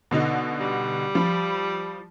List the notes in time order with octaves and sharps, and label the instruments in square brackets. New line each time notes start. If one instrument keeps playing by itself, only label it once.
[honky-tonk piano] B2 D3 D#4
[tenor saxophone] G3
[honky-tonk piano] F3 B5